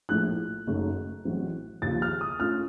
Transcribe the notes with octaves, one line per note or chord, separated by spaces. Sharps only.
A#1 A2 A3 F#6
F#1 F#2 D#3 A3
A1 A2 F#3 C4
D#2 C#3 F3 A6
F6
D#6
A2 A3 C#4 F4 F6